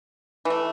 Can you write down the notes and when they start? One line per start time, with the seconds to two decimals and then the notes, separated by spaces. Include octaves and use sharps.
0.45 E3 A3